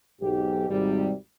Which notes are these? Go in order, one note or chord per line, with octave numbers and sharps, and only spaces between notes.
B1 G#2 G4
G#1 C3 G3